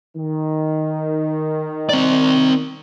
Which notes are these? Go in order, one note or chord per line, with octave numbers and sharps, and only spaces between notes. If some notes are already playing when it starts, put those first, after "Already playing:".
D#3
C4 D5